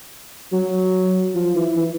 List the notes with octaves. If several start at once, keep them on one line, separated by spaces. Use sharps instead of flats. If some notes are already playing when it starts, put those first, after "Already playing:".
F#3
F3
E3
E3